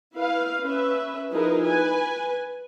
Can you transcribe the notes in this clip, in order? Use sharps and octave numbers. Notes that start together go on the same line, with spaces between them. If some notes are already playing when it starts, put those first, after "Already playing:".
E4 B4 F5
C#4 B4 E5
F3 D#4 E4 G#4 A#4 B4
B4 G#5